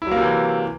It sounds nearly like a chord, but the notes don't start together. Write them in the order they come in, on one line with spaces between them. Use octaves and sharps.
E4 F#3 A#3 C3 E3